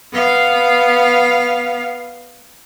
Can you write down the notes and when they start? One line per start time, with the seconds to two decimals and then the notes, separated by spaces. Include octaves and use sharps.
0.13 B3 F5